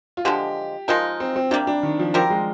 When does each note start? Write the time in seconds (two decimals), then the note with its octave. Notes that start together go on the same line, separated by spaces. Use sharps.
0.17 F4
0.25 D3 F3 G#3 G4
0.88 F3 G#3 D#4 F4 A#4
1.20 C4
1.36 C4
1.51 C3 G3 A#3 D4
1.67 D4
1.83 D#3
1.99 F3
2.14 F3 G3 C4 G4 A#4
2.30 G#3